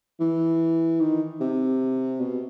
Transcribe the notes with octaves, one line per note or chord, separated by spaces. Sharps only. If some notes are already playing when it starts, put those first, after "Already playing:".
E3
D#3
C3
B2